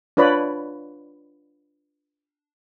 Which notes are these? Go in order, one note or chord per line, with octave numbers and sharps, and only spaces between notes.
D4 F4 B4 C#5 D5 B5